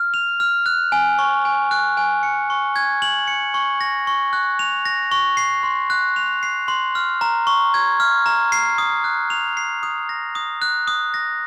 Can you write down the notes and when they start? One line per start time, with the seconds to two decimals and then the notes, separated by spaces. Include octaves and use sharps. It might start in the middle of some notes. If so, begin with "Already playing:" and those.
Already playing: F6
0.14 F7
0.40 F6
0.66 F#6
0.92 G#5
1.19 C#6
1.45 G#5
1.71 F#6
1.97 G#5
2.23 C#7
2.50 C#6
2.76 G#6
3.02 F#7
3.28 C#7
3.54 C#6
3.81 A#6
4.07 C#6
4.33 F#6
4.59 F7
4.85 A#6
5.11 C#6
5.37 C7
5.63 C6
5.90 F#6
6.16 F7
6.43 C7
6.68 C6
6.95 F6
7.21 A#5
7.47 C#6
7.74 G#6
8.00 F6
8.26 A#5
8.52 C7
8.78 D#6
9.04 F#6
9.30 F7
9.57 C7
9.83 D#6
10.09 A#6
10.35 D#6
10.62 F#6
10.87 D#6
11.14 A#6